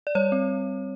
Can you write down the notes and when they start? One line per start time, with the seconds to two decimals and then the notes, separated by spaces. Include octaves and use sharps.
0.07 D5
0.15 G3 C#5
0.32 C4